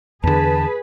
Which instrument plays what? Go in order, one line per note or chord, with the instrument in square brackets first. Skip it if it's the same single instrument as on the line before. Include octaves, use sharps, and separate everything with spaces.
[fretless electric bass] E2 D3 [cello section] G#4 B4 [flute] A5